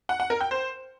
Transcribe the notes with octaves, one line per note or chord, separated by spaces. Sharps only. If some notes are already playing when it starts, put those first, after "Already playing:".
F#5
F#5
A#4
G5
C5